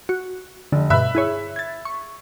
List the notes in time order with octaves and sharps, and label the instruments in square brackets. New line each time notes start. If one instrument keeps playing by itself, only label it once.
[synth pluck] F#4
[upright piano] F1 [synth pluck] D3
[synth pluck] G2 B2 [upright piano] E5 B5 F#6
[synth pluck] E4 G#4 C#5
G#6 A6
C#6